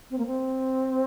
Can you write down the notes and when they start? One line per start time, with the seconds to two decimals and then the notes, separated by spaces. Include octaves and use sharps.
0.11 C4
0.18 A#3
0.26 C4